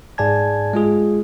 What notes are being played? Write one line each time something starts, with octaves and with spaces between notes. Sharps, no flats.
G#2 G#4 D5 G#5 A5 G#6
G#3 F4 G#4